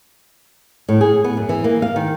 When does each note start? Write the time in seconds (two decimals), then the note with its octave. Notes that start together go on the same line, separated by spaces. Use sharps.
0.89 A2
1.01 G#4
1.24 B3
1.37 F#2
1.49 E3
1.64 A#3
1.82 F5
1.96 D#3